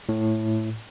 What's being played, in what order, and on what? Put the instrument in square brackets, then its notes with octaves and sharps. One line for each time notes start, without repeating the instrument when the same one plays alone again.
[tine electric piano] A2